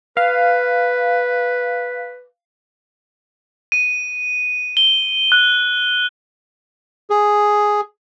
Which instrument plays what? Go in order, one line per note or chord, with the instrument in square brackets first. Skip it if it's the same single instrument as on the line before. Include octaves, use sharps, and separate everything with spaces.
[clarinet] B4 [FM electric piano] F5
[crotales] D#7
G7
F#6
[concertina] G#4